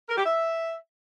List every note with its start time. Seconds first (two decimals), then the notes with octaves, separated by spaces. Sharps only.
0.08 A#4
0.16 G4
0.25 E5